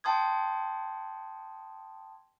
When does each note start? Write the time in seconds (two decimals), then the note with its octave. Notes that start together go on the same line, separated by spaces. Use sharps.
0.04 G5 A5 C6 D#6 G#6